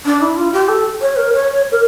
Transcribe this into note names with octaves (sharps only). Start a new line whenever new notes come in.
D4
E4
F4
G4
A4
C#5
A#4
C#5
A#4